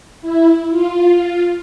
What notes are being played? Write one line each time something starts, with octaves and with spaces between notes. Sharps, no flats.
E4
F4